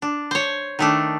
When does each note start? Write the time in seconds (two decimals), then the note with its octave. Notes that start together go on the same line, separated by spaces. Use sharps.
0.02 D4
0.31 C5 C#5
0.79 D#3 A3 D4